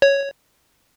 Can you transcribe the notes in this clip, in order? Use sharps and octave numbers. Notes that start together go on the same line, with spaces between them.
C#5